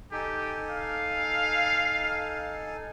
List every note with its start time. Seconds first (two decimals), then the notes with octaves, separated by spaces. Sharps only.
0.12 D#4 G4 A4 G#5
0.70 F5